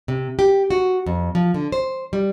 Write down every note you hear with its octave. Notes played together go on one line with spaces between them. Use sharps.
C3
G4
F#4
F2
F3
D3
C5
G3